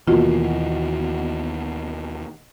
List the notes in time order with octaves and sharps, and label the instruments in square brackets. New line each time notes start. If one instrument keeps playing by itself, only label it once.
[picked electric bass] D#2 E3 [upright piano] B2 A#3 [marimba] F4